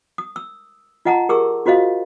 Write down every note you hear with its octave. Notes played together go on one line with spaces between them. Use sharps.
D#6
E6
F4 D#5 F#5 A5 A#5
G4 G#4 A#4 C#6 E6
F4 F#4 C5 D#5 F5